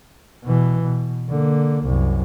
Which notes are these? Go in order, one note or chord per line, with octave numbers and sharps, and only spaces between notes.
B2 E3
B2
D3 A#3
C2 F#2